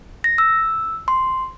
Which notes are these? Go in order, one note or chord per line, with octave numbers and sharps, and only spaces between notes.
A#6
E6
C6